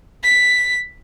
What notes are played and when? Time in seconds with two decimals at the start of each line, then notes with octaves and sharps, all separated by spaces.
0.24 B6